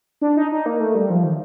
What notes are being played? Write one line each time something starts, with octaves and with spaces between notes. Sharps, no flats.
D4
D#4
D#4
A#3
A3
G3
F3
D#3